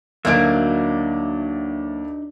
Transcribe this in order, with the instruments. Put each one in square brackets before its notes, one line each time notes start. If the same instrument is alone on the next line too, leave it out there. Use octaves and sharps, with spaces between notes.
[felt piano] D2 D5 D7 [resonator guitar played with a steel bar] F#3 A#3 [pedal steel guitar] D4 D#4 E5